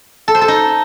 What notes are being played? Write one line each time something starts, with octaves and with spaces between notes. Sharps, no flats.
A4
C5
A4
D#4